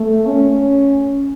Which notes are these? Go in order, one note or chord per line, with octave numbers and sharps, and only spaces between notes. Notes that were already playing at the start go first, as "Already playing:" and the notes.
Already playing: A3
C#4